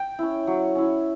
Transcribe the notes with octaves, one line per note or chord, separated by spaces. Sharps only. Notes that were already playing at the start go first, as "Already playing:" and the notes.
Already playing: G5
C#4 E4
F#3
C#4 E4